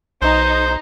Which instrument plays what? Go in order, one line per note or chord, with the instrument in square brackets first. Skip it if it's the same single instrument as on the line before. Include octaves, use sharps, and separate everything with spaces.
[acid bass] B1 [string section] D#4 [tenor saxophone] C5